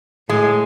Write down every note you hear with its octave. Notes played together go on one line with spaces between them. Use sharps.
A2 G#3